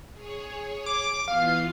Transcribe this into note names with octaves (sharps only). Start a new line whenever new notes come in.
G#4 C#5
D6
E3 B3 F4 F5